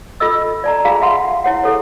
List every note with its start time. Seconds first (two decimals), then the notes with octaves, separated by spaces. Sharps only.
0.20 F4 A4 D#5 E6
0.64 D5 A5 A#5
0.85 F4 G#4 F5 G#5 A#5
1.02 E5 F#5 C6
1.44 E4 C#5 F#5
1.64 E4 G#4 A4 C#5